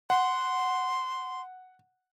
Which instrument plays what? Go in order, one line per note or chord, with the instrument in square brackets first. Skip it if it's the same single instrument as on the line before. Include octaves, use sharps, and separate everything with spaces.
[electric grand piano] F#5 [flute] C6